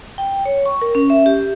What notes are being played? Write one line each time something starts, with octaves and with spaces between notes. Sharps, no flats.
G5
C#5
C#6
A#4
C#4
E5
G4